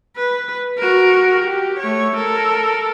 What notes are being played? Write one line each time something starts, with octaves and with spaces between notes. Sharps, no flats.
B4
F#4 A#4
G4
A3 C#5
A4 A#4